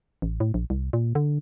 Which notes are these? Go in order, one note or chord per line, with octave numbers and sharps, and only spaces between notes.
A1
A2
A#1
C2
A#2
D3